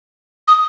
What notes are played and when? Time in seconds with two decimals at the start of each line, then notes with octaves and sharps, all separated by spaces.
0.48 D#6